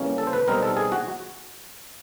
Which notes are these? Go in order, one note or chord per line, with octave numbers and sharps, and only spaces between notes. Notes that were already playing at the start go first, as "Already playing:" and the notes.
Already playing: C#3 E3 G3 A#3 C#4
A4
C5
B4
B2 G3 C4 D#4 A#4
A4
G#4
F#4